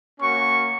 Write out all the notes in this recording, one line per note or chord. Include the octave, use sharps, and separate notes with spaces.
A#3 C#4 F#4 C#6